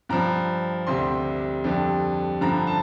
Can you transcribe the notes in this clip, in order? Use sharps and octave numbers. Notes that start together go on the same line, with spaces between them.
G2 F3 A#5
D2 C3 G3 C6
F2 D3 G3
G2 D3 F3 A#5
A5